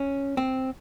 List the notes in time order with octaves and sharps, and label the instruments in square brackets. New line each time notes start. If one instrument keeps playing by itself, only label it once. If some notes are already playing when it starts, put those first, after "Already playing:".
Already playing: [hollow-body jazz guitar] C#4
C4